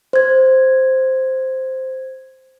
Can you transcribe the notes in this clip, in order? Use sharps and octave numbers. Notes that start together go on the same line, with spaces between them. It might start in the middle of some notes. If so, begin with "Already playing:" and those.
C5 G#6